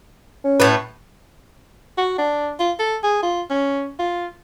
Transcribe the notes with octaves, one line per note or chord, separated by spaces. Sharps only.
C#4
A2 A3 B4
F#4
D4
F4
A4
G#4
F4
C#4
F4